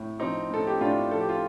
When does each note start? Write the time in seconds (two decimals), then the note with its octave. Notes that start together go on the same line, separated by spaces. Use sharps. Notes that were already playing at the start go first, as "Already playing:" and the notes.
Already playing: A2
0.19 F3 C4 D#4
0.50 A2 A4
0.67 G4
0.81 A2 D4 F4
1.11 F3 A4
1.20 G4
1.29 F4